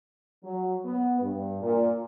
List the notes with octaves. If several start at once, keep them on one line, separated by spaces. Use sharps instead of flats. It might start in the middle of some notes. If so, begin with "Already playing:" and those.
F#3
B3
G2
A#2